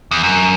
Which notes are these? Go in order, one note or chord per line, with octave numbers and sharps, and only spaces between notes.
E2
F#2